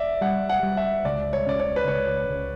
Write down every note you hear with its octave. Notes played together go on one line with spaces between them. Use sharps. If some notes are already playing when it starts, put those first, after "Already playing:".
Already playing: D5 E5
G3 F#5
F#5
G3
E5
C#2 D5
C#5
C#3 D5
C#5
B4
C#2 C#5
C#2